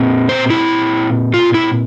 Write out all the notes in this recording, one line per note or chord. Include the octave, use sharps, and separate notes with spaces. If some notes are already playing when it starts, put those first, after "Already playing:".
Already playing: A#2 C4
C5
E4
F4
E4